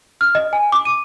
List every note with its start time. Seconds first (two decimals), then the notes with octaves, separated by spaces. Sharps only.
0.21 F6
0.35 D#5
0.53 G#5
0.72 D6
0.85 D#7